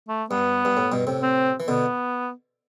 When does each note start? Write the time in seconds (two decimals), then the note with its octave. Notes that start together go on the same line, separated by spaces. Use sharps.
0.08 A3
0.30 G2 B3
0.65 G2
0.77 A2
0.92 G2 B2
1.07 A2 C3
1.23 C4
1.60 E3
1.67 B2 D3 B3